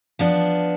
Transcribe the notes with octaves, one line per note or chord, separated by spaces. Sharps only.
F3 B3 D4